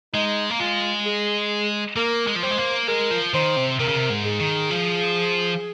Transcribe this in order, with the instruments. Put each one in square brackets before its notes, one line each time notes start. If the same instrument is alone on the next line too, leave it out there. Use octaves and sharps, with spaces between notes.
[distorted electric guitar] G#3 [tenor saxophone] D#4
[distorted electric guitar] A#3
[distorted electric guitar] G#3 [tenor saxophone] F4
[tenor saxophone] G#4
[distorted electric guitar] A#3 [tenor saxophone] A#4
[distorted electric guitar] G#3
F3
[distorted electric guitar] G3 [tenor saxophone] C5
[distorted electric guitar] G#3
A#3
[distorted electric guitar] G#3 [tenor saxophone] A#4
[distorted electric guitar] F3
[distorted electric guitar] D#3 [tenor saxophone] C5
[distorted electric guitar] C3
[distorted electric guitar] C3 [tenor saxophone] A#4
[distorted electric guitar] C#3
C3
G#2
[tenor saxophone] G#4
[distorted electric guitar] D#3
F3